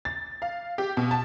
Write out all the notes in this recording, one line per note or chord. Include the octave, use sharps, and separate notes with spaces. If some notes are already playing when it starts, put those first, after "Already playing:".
A6
F5
G4
B2
A5